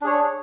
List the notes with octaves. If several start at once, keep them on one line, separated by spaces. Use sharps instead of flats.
D4 G#4 C#5